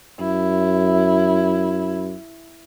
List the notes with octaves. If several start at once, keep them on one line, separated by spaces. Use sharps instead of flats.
F#2 E4